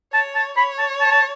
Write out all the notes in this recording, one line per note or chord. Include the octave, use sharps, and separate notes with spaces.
C#5 A5
A5
C#5 B5
A5
A5
A5